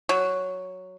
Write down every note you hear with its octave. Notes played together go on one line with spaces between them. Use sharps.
F#3